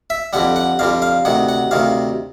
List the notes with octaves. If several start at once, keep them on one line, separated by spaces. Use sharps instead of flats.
E5
F2 D3 G3 F#5
F#5
F2 D3 G3 F5
F5
D2 C3 D#3 F#5
F#5
D2 C3 D#3 F5